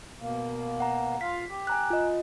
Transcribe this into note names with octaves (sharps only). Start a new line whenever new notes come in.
B2 A#3
F#5 A#5
F4 F5 B6
G4
G#5 A#5 F#6
F4 D#5